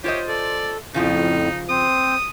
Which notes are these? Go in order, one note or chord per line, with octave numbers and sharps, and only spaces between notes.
F4 G4 C5 C#5 D#5
A4 D5
F2 A2 C#3 F3 D#4 F4
C4 C5 D#6